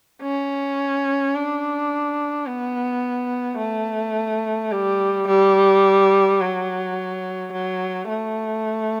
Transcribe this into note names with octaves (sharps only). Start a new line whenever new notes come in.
C#4
D4
B3
A3
G3
G3
F#3
F#3
A3